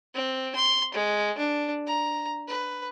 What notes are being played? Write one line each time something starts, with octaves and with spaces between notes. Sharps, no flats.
C4
C6
G#3
D4
A#5
B4